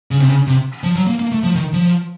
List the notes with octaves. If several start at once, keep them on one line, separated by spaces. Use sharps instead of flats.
C#3
C3
C#3
C3
F3
F#3
A#3
A#3
A3
F3
D#3
F3